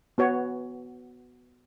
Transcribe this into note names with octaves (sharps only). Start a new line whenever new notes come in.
B3 F#4 C#5